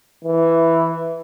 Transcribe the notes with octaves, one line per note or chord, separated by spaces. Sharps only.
E3